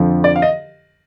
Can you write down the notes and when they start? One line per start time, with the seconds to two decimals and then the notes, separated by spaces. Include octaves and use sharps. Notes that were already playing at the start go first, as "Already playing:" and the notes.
Already playing: F2 D3 F3
0.24 D5
0.36 F5
0.42 D#5